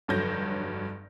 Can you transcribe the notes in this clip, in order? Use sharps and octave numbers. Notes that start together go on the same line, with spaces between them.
F1 G2 D3 F#3 G6 A#6